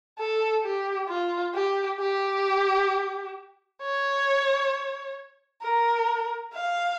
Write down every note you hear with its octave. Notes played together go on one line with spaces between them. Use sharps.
A4
G4
F4
G4
G4
C#5
A#4
F5